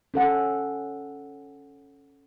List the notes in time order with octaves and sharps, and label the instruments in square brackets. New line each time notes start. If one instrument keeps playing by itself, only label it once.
[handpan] C#4 A4 F#5